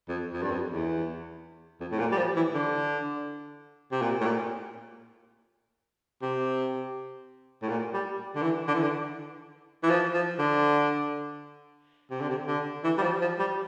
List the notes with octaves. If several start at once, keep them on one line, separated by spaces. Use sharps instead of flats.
F2
F2
G2
F2
E2
F2
A2
A#2
G3
F3
E3
D3
C3
A#2
A2
A#2
C3
A2
A#2
G3
D3
E3
D3
E3
D3
E3
F3
F3
D3
C3
D3
C3
D3
E3
G3
F3
F3
G3